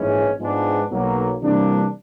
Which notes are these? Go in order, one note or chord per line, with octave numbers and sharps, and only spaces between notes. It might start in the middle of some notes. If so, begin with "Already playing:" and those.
Already playing: A#1 G#2 E3 G#3 C#4
G#2 F3 G#3 B3 D4
B1 B2 F#3 A#3
C3 E3 G3 A#3 D4